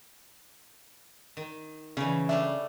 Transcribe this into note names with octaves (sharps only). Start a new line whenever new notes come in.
D#3
C#3 E3 C#4
G3 A3 D4 E5